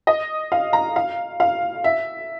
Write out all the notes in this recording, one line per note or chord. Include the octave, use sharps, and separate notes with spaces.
D#5
F5
A#5
F5
F5
E5